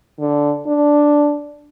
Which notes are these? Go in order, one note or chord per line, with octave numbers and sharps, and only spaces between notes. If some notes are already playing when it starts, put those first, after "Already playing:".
D3
D4